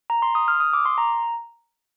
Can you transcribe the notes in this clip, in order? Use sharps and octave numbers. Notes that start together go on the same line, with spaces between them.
A#5
C6
D#6
F6
D#6
D6
C6
A#5